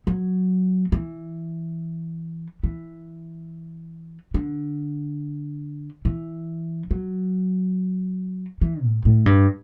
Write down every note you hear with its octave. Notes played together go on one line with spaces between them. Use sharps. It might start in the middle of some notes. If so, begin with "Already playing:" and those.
F#3
E3
E3
D3
E3
F#3
E3
A2
A2
G2